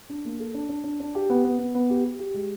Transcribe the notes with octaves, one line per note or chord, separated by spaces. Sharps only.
D4
A#3
A4
D4
D4
D4
D4
G4
B3
B3
B3
B3
G4
G4
G4
G#3